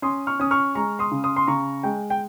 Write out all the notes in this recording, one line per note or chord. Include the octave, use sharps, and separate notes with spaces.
C#4 C6 D#6
C#6 F6
C#4 D#6
C#6 F6
G#3 A#5 C#6
C6 D#6
C#3
C6 D#6
C6
C#3 A#5 C#6
G#3 G5
G5